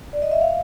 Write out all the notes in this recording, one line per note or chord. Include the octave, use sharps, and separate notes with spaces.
D5
D#5
E5
F5